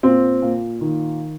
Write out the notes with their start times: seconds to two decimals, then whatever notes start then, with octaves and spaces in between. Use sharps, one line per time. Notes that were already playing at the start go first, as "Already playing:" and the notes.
0.03 A#2 C4
0.42 A#2
0.81 D#3